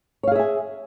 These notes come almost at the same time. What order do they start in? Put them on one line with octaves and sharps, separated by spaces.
C#5 F5 G#4 E5 G#5